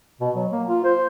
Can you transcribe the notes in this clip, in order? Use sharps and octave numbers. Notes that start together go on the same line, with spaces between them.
B2
F#3
A#3
F4
C5